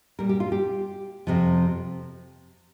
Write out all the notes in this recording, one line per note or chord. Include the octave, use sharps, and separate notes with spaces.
A#2 G3 A#4
G4
F4
G4
F2 C3 F3